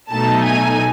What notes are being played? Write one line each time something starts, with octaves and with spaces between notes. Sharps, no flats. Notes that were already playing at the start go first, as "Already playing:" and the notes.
B2 F#3 A3 D#4 A5
G#5